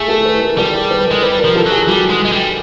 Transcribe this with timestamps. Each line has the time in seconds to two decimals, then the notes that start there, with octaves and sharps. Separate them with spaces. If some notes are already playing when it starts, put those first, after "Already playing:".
Already playing: A3 G#4
0.08 A4
0.25 B4
0.42 A#4
0.57 G3 A4
0.74 G#4
0.91 B4
1.06 G#3 A#4
1.23 G3 B4
1.39 A#4
1.45 F3
1.55 A4
1.66 F#3
1.71 G#4
1.88 G3 F#4
2.10 G#3
2.25 G#3
2.32 G3